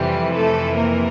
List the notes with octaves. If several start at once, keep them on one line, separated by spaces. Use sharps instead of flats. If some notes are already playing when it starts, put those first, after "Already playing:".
Already playing: F2 C3 E3 G3 G4
A3 A4
A#3 A#4